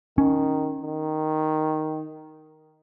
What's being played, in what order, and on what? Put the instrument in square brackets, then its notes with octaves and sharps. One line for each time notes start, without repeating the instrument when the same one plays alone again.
[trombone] D#3 [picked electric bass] C#4
[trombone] D#3